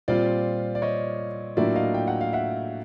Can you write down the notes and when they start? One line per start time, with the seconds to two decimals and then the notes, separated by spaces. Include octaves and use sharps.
0.08 A#2 G3 C4 F4 C5 D5
0.75 D5
0.82 C#5 D#5
1.57 A2 F#3 A#3 D4 F4 D5 E5
1.75 D#5 F5
1.94 G5
2.08 F#5
2.21 F5
2.33 E5 F#5